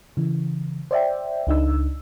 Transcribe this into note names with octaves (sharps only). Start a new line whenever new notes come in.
C#3 E3
C5 D5 E5 G5
C#2 D4 D#4 E6